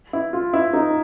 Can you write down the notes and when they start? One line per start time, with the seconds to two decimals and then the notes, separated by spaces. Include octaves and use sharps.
0.13 E4
0.33 F4
0.53 E4
0.73 D#4